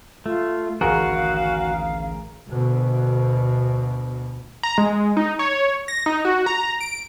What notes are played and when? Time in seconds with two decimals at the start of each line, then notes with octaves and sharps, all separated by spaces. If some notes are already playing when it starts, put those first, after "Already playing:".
0.26 A3 F4
0.81 A1 D2 D#3 F#4 G#4 A#4 F5
2.50 D2 B2
4.63 A#5
4.78 G#3
5.17 D#4
5.39 C#5
5.88 A#6
6.06 D#4
6.25 F#4
6.46 A#5
6.81 D7